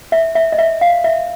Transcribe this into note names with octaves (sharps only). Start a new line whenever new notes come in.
E5
E5
D#5
E5
F5
E5